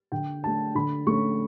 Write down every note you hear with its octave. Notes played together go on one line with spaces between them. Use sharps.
D3 G5
A3 D4 A5
D3 B5
A3 C#4 C#6